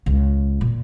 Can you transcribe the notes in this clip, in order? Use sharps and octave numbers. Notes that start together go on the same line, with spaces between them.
C#2
A#2